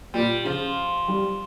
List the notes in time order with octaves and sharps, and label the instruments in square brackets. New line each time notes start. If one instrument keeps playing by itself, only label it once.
[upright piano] A#2 [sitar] G3
[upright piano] C#3 [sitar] F3
[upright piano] G3